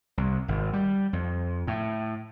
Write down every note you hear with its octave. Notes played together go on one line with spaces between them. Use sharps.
C2
G#1
G3
F2
A2